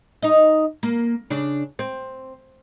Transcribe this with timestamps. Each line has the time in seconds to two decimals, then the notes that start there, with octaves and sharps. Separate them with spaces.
0.22 D#4 D#5
0.83 A#3
1.30 C#3 D4
1.79 C4